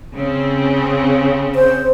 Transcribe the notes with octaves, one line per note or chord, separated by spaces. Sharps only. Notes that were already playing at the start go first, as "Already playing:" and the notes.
C#3 C4
C5